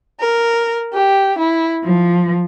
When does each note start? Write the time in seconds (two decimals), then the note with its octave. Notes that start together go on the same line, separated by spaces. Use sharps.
0.20 A#4
0.94 G4
1.39 E4
1.83 F3